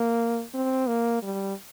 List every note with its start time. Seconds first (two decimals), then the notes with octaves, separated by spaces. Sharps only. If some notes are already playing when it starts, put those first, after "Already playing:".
Already playing: A#3
0.54 C4
0.88 A#3
1.23 G3